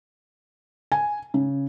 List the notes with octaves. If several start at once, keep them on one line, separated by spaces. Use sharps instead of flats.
G#5
C#3